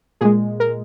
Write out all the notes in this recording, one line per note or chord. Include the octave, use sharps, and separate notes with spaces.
A#2 G#3 G#4
A#4